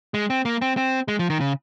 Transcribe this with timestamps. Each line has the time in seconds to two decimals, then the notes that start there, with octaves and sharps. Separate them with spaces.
0.14 G#3
0.30 C4
0.45 A#3
0.62 C4
0.77 C4
1.08 G#3
1.19 F3
1.30 D#3
1.41 C#3